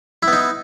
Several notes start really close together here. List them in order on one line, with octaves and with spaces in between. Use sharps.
E4 B3 D#4